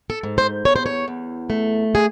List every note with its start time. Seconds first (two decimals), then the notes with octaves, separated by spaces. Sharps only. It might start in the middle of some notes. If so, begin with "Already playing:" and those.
0.10 A4
0.23 G#2
0.38 C5
0.65 E2 C#5
0.76 C5
0.86 C#5
1.08 E2
1.50 A3
1.95 G#4